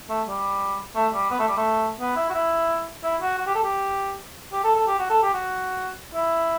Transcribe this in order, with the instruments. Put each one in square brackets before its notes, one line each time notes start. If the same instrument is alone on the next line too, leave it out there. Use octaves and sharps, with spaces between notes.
[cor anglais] A3
G3
A3
G3
B3
A3
G3
A3
B3
E4
F#4
E4
E4
F#4
F#4
G4
A4
G4
G4
A4
A4
G4
F#4
A4
G4
F#4
E4